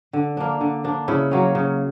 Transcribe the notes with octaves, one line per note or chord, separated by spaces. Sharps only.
D3
A#3 D4
D3
A#3 D4
C#3 E4
F#3 A#3 C#4
C#3